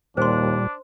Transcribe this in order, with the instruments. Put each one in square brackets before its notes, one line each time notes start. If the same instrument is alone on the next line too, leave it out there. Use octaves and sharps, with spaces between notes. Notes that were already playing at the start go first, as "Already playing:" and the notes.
[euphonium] D#2 [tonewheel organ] A#2 G3 [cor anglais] D4 [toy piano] C5 C6